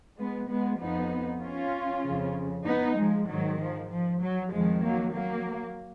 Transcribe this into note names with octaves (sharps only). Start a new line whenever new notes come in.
G#3 B3
G#3 B3
F2 F3 B3 D#4
C#4 F4
F2 C#3 F3
B3 D#4
F3 G#3
G#2 D#3 F#3
F3
F3
F#3
F2 D#3 F3 G#3
F#3 A#3
F#3 A#3